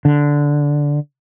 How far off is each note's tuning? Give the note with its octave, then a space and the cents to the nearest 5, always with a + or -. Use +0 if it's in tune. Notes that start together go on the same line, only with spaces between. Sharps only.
D3 -10